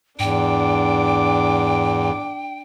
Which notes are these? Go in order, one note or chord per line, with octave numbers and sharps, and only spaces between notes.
E2 G#2 D4 G5 D6